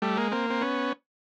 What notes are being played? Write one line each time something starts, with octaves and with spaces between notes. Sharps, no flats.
G3 A3
G#3 A#3
A#3 C4
C4
B3 C#4